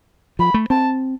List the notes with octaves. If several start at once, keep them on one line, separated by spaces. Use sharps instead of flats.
F3 B5
A3
C4 A5